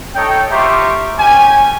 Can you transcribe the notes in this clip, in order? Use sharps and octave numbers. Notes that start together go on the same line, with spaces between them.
D#4 A4 C#5 G5
F4 G4 C5 E5 A#5 C#6
C#4 G4 G#5